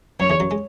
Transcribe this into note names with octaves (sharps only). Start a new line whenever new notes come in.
F#2 F#3 C#5
E2 E3
F#2 F#3
G#3